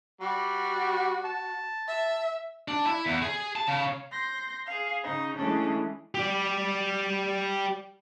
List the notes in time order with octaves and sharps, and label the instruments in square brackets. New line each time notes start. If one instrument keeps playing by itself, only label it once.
[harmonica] G3 [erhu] F#4
[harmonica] A5
[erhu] E5
[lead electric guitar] D4
E4
E2
G#4
A5
C#3
[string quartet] C6 G6 A#6
G#4 F5
C#3 D#4
E3 G#3 A3 C#4 D4
[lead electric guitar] G4 D5